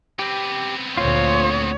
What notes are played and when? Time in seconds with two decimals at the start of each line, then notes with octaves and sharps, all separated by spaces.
0.19 B3 C4 G4
0.97 D2 A#2 F4 C5 C#5